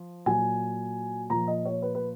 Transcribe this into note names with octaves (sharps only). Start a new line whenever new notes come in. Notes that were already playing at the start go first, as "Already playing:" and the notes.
Already playing: F3
A#2 F#3 G#5
A#2 F3 A#5
D#5
C#5
B4
B4